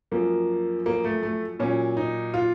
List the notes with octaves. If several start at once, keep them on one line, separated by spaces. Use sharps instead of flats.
F#2 F3 A#3
A#3
A3
A3
A#2 F#3 C#4
D#4
F4